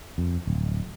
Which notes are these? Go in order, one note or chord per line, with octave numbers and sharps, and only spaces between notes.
F2
D1